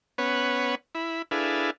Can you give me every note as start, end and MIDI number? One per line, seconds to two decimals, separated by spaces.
0.18 0.75 59
0.18 0.75 61
0.18 0.75 71
0.18 0.75 73
0.18 0.75 78
0.95 1.22 64
0.95 1.22 83
1.31 1.70 62
1.31 1.70 64
1.31 1.70 68
1.31 1.70 69
1.31 1.70 71
1.31 1.70 77